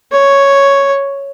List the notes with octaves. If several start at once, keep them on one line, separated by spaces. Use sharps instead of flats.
C#5